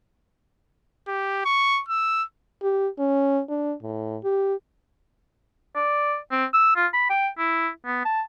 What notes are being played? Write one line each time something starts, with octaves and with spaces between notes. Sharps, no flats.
G4
C#6
E6
G4
C#4
D4
A2
G4
D5
C4
E6
F4
B5
G5
E4
B3
A5